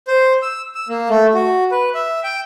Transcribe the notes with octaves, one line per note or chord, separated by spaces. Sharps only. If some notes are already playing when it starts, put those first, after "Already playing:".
C5
E6
E6
A#3
A3
F#4
B4
E5
G5